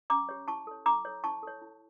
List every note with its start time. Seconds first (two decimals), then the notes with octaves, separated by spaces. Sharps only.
0.10 C#4 A#5 D6
0.29 G4 C#5
0.48 E4 A5 C#6
0.67 A4 C#5
0.86 E4 A#5 D6
1.05 A4 C#5
1.24 E4 A5 C#6
1.43 A4 C#5
1.62 E4